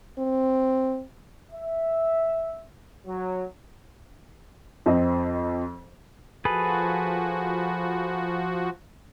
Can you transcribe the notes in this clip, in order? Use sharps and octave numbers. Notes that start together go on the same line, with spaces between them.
C4
E5
F#3
F2 C4 D#5
F3 F#4 G#4 A4 B4